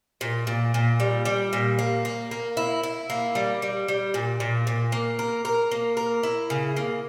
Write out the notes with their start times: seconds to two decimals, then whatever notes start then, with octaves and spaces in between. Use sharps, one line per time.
0.21 A#2
0.47 A#2
0.74 A#2
1.00 G3
1.25 G3
1.53 A#2
1.79 A#3
2.05 A#3
2.31 A#3
2.57 E4
2.83 E4
3.10 A#3
3.35 G3
3.62 G3
3.88 G3
4.14 A#2
4.40 A#2
4.67 A#2
4.92 A#3
5.19 A#4
5.45 A#4
5.72 A#3
5.97 A#4
6.23 E4
6.50 C#3
6.77 A#3